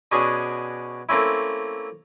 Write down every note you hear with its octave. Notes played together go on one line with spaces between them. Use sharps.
B2 C#4 D4 F#4 G#4
A3 A#3 C4 C#4 E4